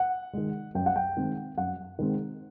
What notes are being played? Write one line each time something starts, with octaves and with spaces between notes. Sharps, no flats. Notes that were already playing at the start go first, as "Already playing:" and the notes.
Already playing: F#5
D#3 G#3
F#2 G5
F#5
G5
D#3 G#3 C4
F#2 F#5
D#3 G#3 C4